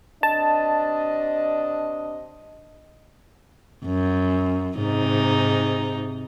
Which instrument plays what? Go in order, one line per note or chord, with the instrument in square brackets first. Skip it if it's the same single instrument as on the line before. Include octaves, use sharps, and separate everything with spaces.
[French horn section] C3 D4 D#5 [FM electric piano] A5
[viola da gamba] F#2
G#2 C3 D#4